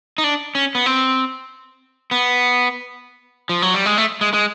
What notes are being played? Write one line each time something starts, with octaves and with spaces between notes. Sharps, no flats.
D#4
D4
C#4
B3
C4
B3
F3
F#3
G3
G#3
A3
G#3
G#3